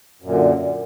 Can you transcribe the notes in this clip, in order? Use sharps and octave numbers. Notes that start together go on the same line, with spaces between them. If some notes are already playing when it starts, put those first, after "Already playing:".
F#2 A#2 D3